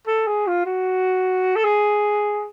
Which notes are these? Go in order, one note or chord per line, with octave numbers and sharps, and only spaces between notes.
A4
G#4
F4
F#4
A4
G#4